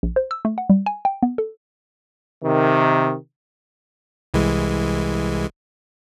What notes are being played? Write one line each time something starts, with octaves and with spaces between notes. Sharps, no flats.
A#1
C5
E6
A3
F#5
G3
G#5
G5
B3
A4
C3 D#3
C2 E3 G#3